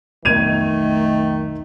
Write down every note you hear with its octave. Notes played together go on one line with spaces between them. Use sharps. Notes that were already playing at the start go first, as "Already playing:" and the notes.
B1 F2 D#3 A3 B3 G#6 D#7 F7